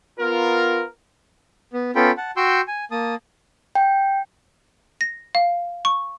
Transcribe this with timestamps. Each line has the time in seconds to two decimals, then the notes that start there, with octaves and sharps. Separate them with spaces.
0.20 B3 F4 A#4
1.73 B3
1.96 B3 C#4 F4 A4 G5 B5
2.17 F#5 A5
2.37 F#4 G5 C6 C#6 E6 G6
2.68 G#5
2.91 A#3 A5 D#6
3.75 G5
5.01 A#6
5.35 F5
5.85 C#6